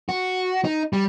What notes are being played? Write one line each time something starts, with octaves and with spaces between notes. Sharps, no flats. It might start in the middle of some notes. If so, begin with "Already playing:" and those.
F#4
D#4
G3